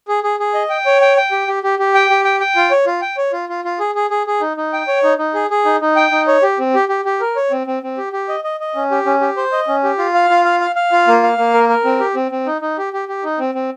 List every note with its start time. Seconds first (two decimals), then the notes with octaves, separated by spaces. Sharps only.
0.08 G#4
0.24 G#4
0.40 G#4
0.54 D#5
0.70 G5
0.86 C#5
1.01 G5
1.17 G5
1.31 G4
1.48 G4
1.63 G4
1.79 G4
1.94 G5
2.10 G4
2.24 G5
2.40 G5
2.56 F4
2.71 C#5
2.86 F4
3.02 G5
3.17 C#5
3.33 F4
3.49 F4
3.65 F4
3.80 G#4
3.95 G#4
4.10 G#4
4.27 G#4
4.41 D#4
4.57 D#4
4.73 G5
4.88 C#5
5.03 D#4
5.18 D#4
5.34 G#4
5.50 G#4
5.65 D#4
5.81 D#4
5.96 G5
6.11 D#4
6.27 C#5
6.43 G4
6.59 C4
6.74 G4
6.89 G4
7.05 G4
7.21 A#4
7.36 C#5
7.51 C4
7.67 C4
7.83 C4
7.98 G4
8.13 G4
8.29 D#5
8.44 D#5
8.60 D#5
8.75 C#4
8.91 G4
9.06 C#4
9.21 G4
9.37 C5
9.52 D#5
9.68 C#4
9.84 G4
9.99 F4
10.14 F5
10.30 F4
10.45 F5
10.60 F5
10.76 F5
10.92 F4
11.07 A#3
11.23 F5
11.38 A#3
11.54 A#4
11.69 A#4
11.84 C4
12.00 G4
12.15 C4
12.31 C4
12.47 D#4
12.62 D#4
12.78 G4
12.93 G4
13.08 G4
13.24 D#4
13.39 C4
13.55 C4